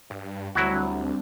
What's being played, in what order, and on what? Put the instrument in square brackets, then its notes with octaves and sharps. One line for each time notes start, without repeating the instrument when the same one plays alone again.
[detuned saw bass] G2
[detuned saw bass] D2 [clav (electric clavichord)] F#3 E4 F#4 [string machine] G3 C4 D4